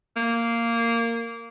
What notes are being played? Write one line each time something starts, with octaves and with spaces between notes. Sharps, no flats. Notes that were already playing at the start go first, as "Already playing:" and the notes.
A#3